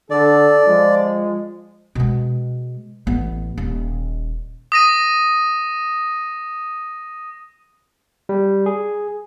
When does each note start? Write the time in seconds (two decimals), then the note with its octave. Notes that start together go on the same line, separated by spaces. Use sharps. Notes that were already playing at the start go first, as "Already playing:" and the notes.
0.10 D3 A4 D5
0.67 F3 G#3
1.95 B2 G#3
3.07 A1 B3
3.58 D#1
4.72 D#6 A#6 D#7
8.29 G3
8.66 G#4